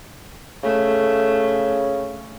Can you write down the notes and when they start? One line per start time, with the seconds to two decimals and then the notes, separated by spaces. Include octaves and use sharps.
0.63 C#3 A3